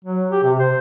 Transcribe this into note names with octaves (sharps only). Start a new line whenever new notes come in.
F#3
G4
C3
C5